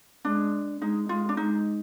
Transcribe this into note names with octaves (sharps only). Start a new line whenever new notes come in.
G#3 D4
G#3 D#4
G#3 F4
D4
G#3 D#4